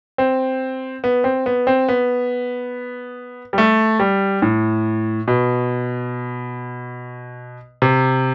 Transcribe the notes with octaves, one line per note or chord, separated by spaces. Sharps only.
C4
B3
C4
B3
C4
B3
G3
A3
G3
A2
B2
C3